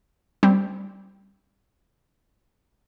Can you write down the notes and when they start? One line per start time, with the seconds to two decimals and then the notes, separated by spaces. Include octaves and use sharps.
0.43 G3 C4